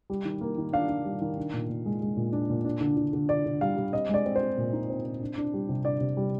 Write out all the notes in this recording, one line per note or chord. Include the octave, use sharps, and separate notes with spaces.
G3
D#3
A#3
D#3
D4 F5
D4
G3
D#3
D4
A#2
A#2
G#3
G#3
A#2
D4
A#2
D4
D3
D3
D3
D3 D5
D3
G3 F5
G3
C4 D#5
G#3 D5
C4
C5
C4
A#2
D#4
C4
C4
D4
D4
G3
C3
D4 D5
C3
G3